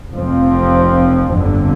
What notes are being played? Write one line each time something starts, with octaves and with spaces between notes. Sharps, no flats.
F1 F2 F3 C4
G1 F2 D3